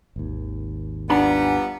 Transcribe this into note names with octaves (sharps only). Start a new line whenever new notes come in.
G#1 D#2
F3 G3 B3 D4 F#5 G#5 A#5